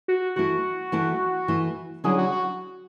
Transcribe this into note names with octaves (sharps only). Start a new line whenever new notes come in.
F#4
E3 A3 E4 F#4
E3 A3 E4
E3 A3 E4
D3 F#3 C#4 E4 G#4
F#4
F#4